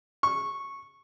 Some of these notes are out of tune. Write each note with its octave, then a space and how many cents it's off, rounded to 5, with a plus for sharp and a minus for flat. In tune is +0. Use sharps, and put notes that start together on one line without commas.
C#6 -10